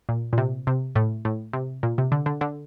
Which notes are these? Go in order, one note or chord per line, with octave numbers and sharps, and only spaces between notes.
A#2
A#2
C3
C3
A2
A2
C3
A#2
C3
D3
D3
D3